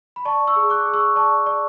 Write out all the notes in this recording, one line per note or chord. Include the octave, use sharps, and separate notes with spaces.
B5
D5 A5 C#6
C#6 E6
G#4
D6 F#6
G#4
C#6 E6
D5 A5 C#6
D5